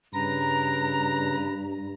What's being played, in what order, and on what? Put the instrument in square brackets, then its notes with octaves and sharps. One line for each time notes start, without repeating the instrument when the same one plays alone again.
[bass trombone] G2 [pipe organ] C#3 B4 A#6 [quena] A#5